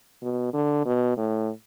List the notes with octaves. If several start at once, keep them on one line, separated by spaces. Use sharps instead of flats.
B2
D3
B2
A2